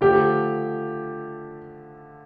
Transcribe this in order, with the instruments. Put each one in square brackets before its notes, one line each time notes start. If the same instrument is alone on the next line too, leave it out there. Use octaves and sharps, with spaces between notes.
[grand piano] D3 F3 A3 D4 A4 [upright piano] G4